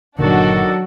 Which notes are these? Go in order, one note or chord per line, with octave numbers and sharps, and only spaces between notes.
G1 A#2 D3 D#3 F#3 D4 F#4 A4